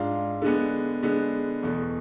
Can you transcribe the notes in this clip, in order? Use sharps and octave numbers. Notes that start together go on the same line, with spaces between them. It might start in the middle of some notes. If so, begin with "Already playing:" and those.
Already playing: G#2 G#3 D4 F4
D3 G#3 B3
D3 G#3 B3
E2 B2 A3